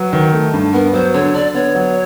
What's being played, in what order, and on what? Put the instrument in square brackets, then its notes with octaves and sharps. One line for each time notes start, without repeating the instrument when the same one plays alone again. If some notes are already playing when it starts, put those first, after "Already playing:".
Already playing: [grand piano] F#3 [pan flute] B4
[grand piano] D#3
A3
G2
[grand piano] B3 [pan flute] A#4
[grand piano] F#3 [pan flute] C5
[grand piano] D3 [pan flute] C#5
[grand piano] D3 [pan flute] D5
[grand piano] B3 [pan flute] C#5
[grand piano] F#3